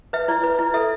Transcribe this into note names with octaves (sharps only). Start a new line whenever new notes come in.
B4 E5
E4 D5
B4
E4
A4 E5